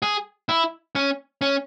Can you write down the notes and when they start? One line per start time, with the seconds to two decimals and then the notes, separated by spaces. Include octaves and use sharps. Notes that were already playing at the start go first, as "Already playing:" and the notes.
0.03 G#4
0.49 E4
0.95 C#4
1.42 C#4